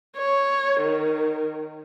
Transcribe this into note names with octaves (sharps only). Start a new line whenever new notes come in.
C#5
D#3